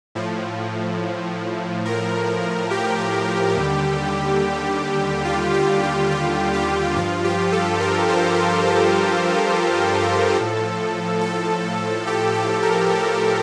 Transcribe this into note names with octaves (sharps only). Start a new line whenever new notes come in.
A2 F3
A#4
G4
D#2 D3 G3
F4
G4
G4
F4
G4
G2 F3 F4
G4
A4
A#4
C5
A#4
A4
A2 F3
A4
G4
G4
A#4
A4